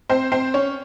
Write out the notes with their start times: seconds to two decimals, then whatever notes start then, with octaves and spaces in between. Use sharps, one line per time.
0.09 C4 C5
0.32 C4 C5
0.54 C#4 C#5